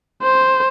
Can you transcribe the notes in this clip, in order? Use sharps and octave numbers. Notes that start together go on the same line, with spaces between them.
C5